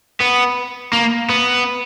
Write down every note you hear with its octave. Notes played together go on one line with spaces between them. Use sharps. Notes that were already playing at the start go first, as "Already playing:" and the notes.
B3
A#3
B3